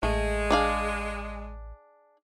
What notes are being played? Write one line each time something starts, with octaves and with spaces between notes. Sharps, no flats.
A1 G#3 A3
D4 G#4 F5